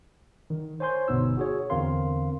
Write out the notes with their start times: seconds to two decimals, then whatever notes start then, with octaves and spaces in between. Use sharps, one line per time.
0.50 D#3
0.80 C5 C#5 G#5 C6 G6
1.08 G1 B2 B3 D#4 E6
1.37 F#4 G#4 C#5
1.70 E2 D3 C4 A#4 F5 C6